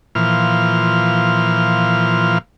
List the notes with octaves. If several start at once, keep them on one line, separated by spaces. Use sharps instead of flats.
A#2 E3 F3 F6